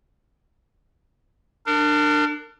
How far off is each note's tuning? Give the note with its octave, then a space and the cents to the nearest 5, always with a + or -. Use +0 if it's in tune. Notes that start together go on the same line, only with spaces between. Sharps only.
D4 +20 A#4 -25